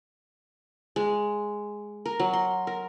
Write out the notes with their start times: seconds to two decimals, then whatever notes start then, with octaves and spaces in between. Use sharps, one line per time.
0.96 G#3
2.06 A#4
2.20 F#3
2.33 C6
2.67 A#4